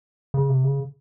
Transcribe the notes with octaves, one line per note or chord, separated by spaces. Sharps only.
C#3
C3
C#3